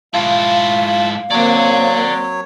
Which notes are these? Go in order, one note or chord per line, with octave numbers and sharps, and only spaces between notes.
G#2 E4 F4 F5 A5
F5
F#3 A#3 C4 C#5 D5 F#5